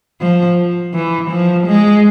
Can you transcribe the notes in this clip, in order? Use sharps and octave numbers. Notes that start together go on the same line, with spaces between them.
F3
E3
F3
G#3